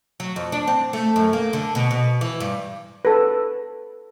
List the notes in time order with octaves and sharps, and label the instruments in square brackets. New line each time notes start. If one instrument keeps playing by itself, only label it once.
[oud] F#3
F2
D4
C4
A3
F#2
A#3
D3
B2
B2
E3
G2
[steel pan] A4 B4